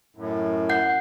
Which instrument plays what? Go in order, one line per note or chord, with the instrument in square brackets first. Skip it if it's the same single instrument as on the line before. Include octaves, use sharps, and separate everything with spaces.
[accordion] F#2 A2
[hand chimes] F#5 G6 C7